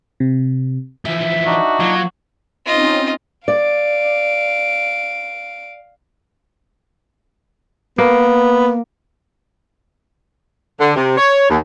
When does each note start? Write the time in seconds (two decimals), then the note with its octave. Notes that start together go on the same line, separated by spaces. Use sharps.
0.20 C3
1.05 E3 F3 E5
1.46 D4 D#4 F#4
1.80 F#3 A#3 F4
2.66 C4 C#4 D#4 F4 D#5
3.48 D5 F5 D7
7.98 A#3 B3
10.79 D3
10.96 C3
11.17 C#5
11.49 D#2